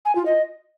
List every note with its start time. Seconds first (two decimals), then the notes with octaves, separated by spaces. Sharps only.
0.05 G#5
0.15 F4
0.25 D#5